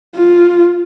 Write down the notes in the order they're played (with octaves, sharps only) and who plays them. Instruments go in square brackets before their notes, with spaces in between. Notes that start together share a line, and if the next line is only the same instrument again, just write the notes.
[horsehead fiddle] F4